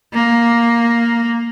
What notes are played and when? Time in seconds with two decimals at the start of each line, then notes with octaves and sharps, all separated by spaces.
0.14 A#3